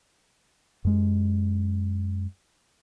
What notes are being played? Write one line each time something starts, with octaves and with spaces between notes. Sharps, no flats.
F#2 G#3